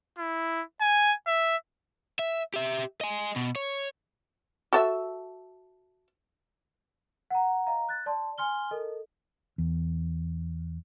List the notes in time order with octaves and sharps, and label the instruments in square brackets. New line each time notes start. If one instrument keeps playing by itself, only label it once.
[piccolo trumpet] E4
G#5
E5
[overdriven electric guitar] E5
G4 E5
D#5 G#5
B2
C#5
[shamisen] F#4 A4 E5
[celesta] F#5 A#5
D#5 F5 A#5
F#6 A6
D5 A5 C6
G#5 C6 F6 G7
A4 A#4 D#5
[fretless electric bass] E2